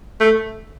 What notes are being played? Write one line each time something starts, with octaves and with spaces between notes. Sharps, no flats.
A3